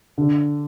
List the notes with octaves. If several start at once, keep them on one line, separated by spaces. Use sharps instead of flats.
D3